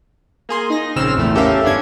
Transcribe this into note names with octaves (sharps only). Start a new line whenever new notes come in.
A#3 G#4 C6
D#4 A#6
A#1 C#3 C4 E6 F6 E7
A#1 E2 A2 A3
C#4 G4 A4 A#4 E5 F5
G1 B3 C#4 D4 G#6